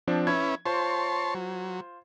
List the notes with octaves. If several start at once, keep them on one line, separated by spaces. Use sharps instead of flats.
F3 C4 D4
C#4 E4 B4 G#6
F4 C5 C#5 A5 C6
F#3